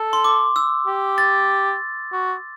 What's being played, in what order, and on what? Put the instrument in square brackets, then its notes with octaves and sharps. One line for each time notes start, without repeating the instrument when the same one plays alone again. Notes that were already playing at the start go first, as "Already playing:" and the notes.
Already playing: [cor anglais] A4
[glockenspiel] C6
D6
E6
[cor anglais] G4
[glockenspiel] A6
[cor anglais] F#4